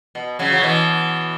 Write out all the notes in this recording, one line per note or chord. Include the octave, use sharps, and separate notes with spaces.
B2
C#3 F#3
F#3
B2 E3